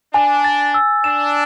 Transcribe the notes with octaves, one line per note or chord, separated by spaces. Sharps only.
D4 G#5
A6
E6
D4 E7